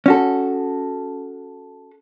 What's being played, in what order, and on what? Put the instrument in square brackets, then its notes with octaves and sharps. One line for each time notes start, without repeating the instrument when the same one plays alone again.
[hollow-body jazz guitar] C#4 F#4 A4